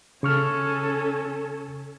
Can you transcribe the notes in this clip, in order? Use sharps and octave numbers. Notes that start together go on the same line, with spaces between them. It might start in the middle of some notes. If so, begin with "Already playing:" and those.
C#3 C#4 A4 C#6 F6